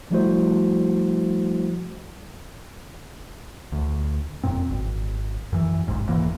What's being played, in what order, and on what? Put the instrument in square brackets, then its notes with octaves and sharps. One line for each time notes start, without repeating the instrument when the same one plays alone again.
[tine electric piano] F3 G3 A3 E4 F#4 C5
[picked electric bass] D2
E1 F#2 A#2 C4
G#1
F#2 E3
G1 C2 G#2
E1 G#2 E3 A#3